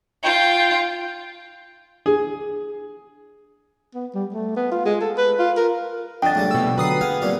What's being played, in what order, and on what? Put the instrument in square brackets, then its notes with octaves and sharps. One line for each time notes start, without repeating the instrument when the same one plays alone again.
[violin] F4 [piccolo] G5
[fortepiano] G#4
[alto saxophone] B3
G3
A3
B3
F4
G#3
A4
B4
F4
A#4
[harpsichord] F2 D3 [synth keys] D4 [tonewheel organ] D#5 [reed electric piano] G5 A6
[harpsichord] A#1 C#3 G3 [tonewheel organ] A3
[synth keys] B2 E6
[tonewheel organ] D3 F#3 [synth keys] B4 D#6 C7
[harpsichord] B3 [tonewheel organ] G#4 F5
[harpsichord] A#2 G3 C4